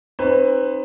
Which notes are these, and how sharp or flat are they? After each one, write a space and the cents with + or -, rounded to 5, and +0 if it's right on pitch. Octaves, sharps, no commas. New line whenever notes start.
C4 +35 D#4 -10 B4 +15